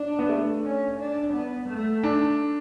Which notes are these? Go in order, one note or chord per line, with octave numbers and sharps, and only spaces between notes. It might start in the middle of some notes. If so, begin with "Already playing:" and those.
Already playing: D4
B3
A3
C#4
D4
B3
A3
D4